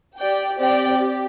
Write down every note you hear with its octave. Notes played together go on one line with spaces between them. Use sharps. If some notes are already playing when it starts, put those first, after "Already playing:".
G4 D5 G5
C4 G4 D5 G5
G4